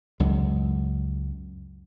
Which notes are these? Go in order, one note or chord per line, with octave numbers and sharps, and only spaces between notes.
C#2 F#2 G#3